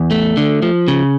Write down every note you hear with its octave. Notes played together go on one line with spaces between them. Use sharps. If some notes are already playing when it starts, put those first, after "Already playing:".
Already playing: E2
A3
D3
F3
C#3